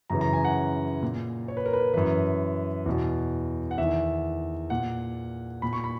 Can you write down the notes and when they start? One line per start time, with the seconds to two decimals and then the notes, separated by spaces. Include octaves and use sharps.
0.10 F#2 C#3 E3 A#5
0.21 A#5
0.33 G#5
0.45 F#5
1.03 A#2
1.48 C#5
1.57 B4
1.66 A#4
1.73 B4
1.94 F#2 E3 B4
2.86 E2 B2
3.71 F#5
3.78 E2 D#3 E5
4.70 A#2 F#5
5.62 A#2 B5
5.73 C#6
5.84 B5